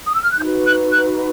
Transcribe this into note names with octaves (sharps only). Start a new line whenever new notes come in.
D#6
E6
F6
F#6
D#4 F#4 B4 G6
F#6
F#6